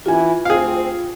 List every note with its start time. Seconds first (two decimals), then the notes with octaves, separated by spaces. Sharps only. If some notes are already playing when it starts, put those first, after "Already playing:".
0.06 E3 E4 F4 G4 G#5
0.45 D2 C4 G#4 F5